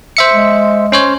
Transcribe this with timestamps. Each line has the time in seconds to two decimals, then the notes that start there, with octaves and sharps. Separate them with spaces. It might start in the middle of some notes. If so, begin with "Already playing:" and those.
0.17 C5 E5 C#7
0.32 G#3
0.92 C#4 C5 C#5